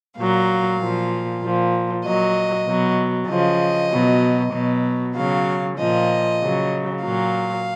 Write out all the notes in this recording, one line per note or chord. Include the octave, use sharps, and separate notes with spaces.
A#2 F#3 F5
A#2 F3
A#2 F3
A#2 F#3 D#5
B2 F#3
C#3 F3 D#5
B2 F#3
B2 F#3
C#3 F#3 F5
A#2 F3 D#5
C#3 F#3
A#2 F#3 F5